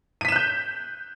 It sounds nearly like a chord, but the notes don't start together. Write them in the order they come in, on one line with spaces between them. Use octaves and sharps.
D#7 B6 E7 F#6 G6